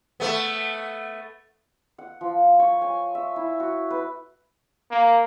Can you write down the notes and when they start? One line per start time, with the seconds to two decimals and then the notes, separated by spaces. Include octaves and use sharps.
0.20 A3 B3
1.98 F#5
2.21 F3
2.59 C#5
2.82 G#5
3.15 E5
3.36 E4
3.60 F#4
3.91 B4
4.91 A#3